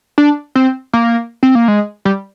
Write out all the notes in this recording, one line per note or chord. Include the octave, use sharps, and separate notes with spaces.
D4
C4
A#3
C4
A#3
G#3
G3